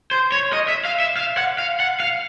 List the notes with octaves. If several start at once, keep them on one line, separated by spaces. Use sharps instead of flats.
C5
C#5
D#5
E5
F5
E5
F5
F#5
F5
F#5
F5